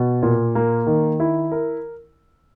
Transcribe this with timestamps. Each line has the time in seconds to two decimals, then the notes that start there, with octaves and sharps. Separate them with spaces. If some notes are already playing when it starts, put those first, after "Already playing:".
Already playing: B2
0.23 A#2
0.55 A#3
0.87 D#3
1.20 E4
1.52 A#4